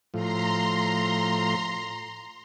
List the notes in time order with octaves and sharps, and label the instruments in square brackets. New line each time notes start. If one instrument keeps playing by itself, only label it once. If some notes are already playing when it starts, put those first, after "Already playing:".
[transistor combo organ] A2 F3 [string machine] A#5 C6